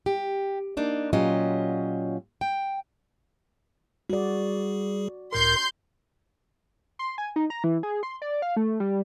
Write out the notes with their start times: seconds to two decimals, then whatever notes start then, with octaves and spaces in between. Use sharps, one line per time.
0.06 G4
0.77 A#3 D4 D#4
1.13 A#2 F#3 C#4 F4 G4 D#5
2.41 G5
4.10 G3 F#4 G#4 D5
5.33 C#2 A2 A#4 C6 G6
6.99 C6
7.18 G#5
7.36 D#4
7.50 A#5
7.64 E3
7.83 G#4
8.03 C6
8.22 D5
8.42 F5
8.56 A3
8.80 G3